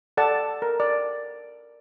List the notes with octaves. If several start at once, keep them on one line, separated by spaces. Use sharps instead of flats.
A4 D5 F#5 A5
A#4
D5